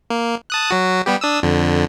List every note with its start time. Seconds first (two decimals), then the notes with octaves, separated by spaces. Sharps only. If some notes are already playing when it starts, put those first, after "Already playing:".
0.10 A#3
0.50 A5 D#6 F#6
0.71 F#3 F#4
1.06 G3 B3 G4
1.21 D4 D#6 E6
1.43 F2 D3